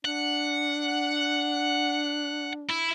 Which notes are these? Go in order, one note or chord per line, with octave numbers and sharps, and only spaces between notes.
D4 F#5
E4